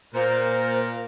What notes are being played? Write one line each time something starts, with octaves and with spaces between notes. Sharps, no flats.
A#2 A#4 C5